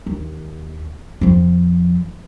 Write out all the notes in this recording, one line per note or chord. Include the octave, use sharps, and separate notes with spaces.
D#2
F2 F3